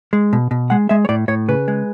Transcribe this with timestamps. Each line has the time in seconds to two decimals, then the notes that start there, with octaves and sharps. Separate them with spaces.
0.13 G#3
0.33 B2
0.51 B2
0.70 G#3 F#5
0.89 G#3 E5
1.05 C#5
1.09 A2 D5
1.28 A2 C#5
1.48 C#3 B4
1.68 G#3